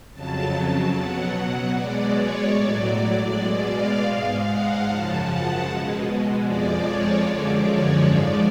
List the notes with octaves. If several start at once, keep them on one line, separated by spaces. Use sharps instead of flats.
F2 C#3 F#3 A5
A5
B2 F#3 F#5
B2 G#3 D5
C#5
A2 F#3 D5
D5
B2 G#3 D5
F5
G#2 G#3 F5
F#5
F#2 C#3 F3 A5
F#5
B2 G#3
F2 F3 G#3 D5
C#5
F#2 D3 F3 G#3 D5
C#5
G#2 F3 G#3 D5